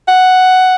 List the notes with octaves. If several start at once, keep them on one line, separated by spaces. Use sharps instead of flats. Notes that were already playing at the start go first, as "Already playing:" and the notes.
F#5